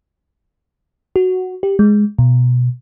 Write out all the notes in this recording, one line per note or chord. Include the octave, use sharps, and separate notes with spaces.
F#4
G4
G#3
B2